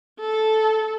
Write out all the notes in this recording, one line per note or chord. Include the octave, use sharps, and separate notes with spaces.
A4